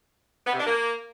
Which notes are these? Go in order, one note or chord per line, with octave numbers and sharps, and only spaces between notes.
B3
C3
D4
A#3